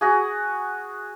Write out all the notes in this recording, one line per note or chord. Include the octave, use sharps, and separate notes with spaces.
F#4 G#4